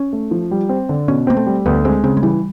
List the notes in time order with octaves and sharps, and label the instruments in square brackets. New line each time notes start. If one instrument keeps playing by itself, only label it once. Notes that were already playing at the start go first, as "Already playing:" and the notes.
Already playing: [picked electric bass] C#4
[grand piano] A3
F3
G3
C4
D3
[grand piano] B2 [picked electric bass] C#4
[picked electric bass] A#3 [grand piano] C4
[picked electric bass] A3
[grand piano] G3
[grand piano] D2 [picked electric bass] B3
[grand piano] G#3 [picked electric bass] C4
[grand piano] C#3 [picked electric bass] C4
[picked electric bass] G#3
[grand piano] E3 [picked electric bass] G3